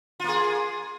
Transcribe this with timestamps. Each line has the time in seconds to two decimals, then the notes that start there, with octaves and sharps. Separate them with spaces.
0.20 F4
0.24 A#3
0.29 G#4